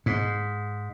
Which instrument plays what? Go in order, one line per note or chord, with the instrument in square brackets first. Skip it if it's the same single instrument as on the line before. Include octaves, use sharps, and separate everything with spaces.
[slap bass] G#2